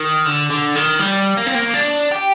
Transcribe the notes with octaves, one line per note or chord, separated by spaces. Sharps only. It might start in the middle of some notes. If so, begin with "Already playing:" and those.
Already playing: D#3
D3
D3
D#3
G3
A#3
C4
A#3
D4
G4